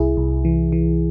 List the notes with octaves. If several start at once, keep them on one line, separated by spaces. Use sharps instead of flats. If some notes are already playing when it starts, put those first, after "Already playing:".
Already playing: C2 E4 G#4
C2
E3
E3